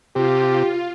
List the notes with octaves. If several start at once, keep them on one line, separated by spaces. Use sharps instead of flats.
C3 F4 G4